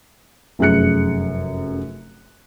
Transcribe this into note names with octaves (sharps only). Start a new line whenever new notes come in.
F1 F#2 G#4 F#6 C#7